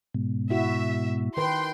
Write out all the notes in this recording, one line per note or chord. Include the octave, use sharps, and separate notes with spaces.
G#2 B2
E4 F#4 E5
D#3 B4 G5 C6